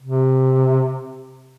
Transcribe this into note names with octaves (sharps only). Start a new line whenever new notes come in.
C3